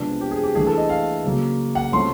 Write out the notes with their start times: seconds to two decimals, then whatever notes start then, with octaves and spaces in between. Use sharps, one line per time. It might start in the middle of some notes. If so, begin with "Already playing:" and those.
Already playing: C3 F3 G#3 B3 D4
0.21 G4
0.31 G#4
0.43 G4
0.55 E3 A3 D4 G#4
0.67 A4
0.78 D#5
0.90 F5
1.24 C#3 F#3 A#3
1.75 F#5
1.92 C3 F3 A3 C#4 C6